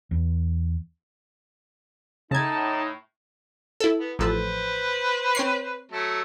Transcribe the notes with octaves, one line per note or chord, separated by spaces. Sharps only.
E2
A2 C#3 D#4 A5 G#6
E4 A4
B3
A1 F3 A4 B4 C5
C4 C#5 C7
F#3 A3 A4